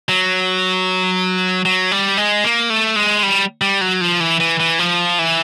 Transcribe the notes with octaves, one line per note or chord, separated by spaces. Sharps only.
F#3
F#3
G3
G#3
A#3
A3
G#3
G3
G3
F#3
F3
E3
E3
E3
F3
E3